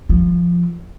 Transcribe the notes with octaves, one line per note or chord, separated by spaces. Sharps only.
F3